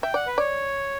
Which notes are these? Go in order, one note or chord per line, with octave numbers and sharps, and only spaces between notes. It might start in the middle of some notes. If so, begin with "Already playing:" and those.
E5 G5
D5 F#5
B4
C#5 D5